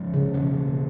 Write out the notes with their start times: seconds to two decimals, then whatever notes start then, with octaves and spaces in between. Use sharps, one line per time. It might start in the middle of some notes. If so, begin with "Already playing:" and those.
Already playing: F3 G#3 C#4
0.14 C#3
0.34 B2 A#3 C#4